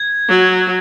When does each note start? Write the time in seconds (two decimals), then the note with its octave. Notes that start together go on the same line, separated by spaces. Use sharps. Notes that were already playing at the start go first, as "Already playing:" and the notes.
Already playing: G#6
0.29 F#3